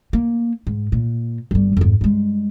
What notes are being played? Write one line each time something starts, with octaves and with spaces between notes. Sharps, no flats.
A#3
G#2
A#2
G1 G3
F2 G#2
G2 G#3